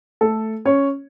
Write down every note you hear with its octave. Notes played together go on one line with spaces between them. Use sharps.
A3 A4
C#4 C#5